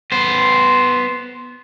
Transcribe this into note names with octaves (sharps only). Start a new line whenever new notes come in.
B3 C5